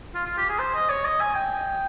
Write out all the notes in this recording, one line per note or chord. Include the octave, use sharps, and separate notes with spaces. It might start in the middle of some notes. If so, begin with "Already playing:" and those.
F4
F4
G4
G#4
C5
D#5
C#5
D#5
G#5
G5